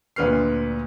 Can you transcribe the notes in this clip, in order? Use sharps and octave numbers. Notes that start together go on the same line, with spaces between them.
D2 A#2 B4 F6 C7